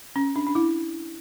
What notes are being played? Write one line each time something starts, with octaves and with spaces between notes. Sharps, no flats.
C#4
D4
D4
E4